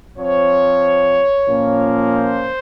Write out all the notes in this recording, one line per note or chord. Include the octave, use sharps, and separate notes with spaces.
F3 C4 C#5
A#2 F3 A#3 C#4
C5